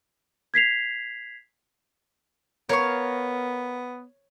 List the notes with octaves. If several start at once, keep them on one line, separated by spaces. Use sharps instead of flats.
G#6 B6 C7 F7
B3 A#4 C#5 F5 C#6